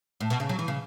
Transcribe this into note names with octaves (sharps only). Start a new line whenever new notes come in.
A2
B2
C#3
F#3
E3
C#3